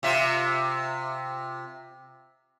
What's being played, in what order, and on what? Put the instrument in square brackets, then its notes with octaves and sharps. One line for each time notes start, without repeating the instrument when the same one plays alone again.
[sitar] C3 F4 E5